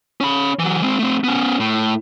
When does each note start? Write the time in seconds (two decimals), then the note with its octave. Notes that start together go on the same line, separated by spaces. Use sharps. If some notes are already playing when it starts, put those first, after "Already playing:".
0.21 C#4 B5
0.59 E3 F#3
0.82 G#3 C4
0.99 A3 C4
1.24 B3 C#4
1.60 A2